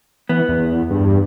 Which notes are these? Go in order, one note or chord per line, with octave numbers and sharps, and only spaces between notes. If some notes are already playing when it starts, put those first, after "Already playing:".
E3 B3
E2
G2